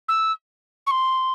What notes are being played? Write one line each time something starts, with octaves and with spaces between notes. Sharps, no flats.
E6
C#6
C6